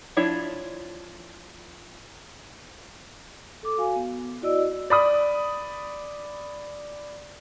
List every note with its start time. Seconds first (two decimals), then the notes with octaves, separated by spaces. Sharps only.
0.17 F3 D4 E4 C#5
3.63 A4 D6
3.78 F#4 F5 G#5
3.96 B3
4.42 E4 F#4 D5 D#5 E6
4.90 D5 B5 D#6